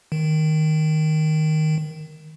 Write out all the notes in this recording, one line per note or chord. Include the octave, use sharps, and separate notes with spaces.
D#3